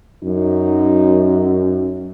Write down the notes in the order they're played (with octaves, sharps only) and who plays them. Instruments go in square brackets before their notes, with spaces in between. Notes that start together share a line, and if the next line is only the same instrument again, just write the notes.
[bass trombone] F#2 [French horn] D#4